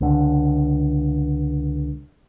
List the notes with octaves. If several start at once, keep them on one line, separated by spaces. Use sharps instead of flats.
C#2 D3